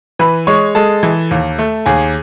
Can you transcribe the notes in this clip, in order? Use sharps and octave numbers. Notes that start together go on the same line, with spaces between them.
E3 B4 B5
G#3 C#5 C#6
G#3 A4 A5
E3
D#2
A3
D#2 G#4 G#5